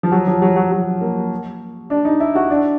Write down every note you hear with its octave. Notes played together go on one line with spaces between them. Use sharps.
F3
F#3
F3
F#3
F#3
F#3
A#3
D4
D#4
E4
F#4
D4